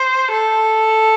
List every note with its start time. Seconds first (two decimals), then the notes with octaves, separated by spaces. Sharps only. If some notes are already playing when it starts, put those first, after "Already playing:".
Already playing: C5
0.31 A4